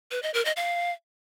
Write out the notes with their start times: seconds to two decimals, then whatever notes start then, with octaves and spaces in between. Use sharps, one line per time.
0.11 B4
0.23 D#5
0.34 A#4
0.45 D#5
0.57 F5